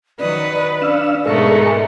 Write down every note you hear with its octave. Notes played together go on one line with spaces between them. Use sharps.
D#3 F#3 B4 D5 D#5
C#4 D4 F5 E6
G#2 B2 G#3 A3 B3 A4 A#4 C#6